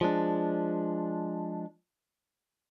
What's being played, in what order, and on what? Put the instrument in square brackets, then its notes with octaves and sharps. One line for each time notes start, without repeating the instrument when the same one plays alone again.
[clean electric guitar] F3 G#3 D4